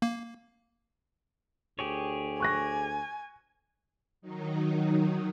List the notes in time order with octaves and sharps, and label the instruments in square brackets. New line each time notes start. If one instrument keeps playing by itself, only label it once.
[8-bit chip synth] A#3
[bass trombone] D2 [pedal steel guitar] G4 G#4 C#5
[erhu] G#5 [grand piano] C#6 F#6 A#6
[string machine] D#3 F#3 D#4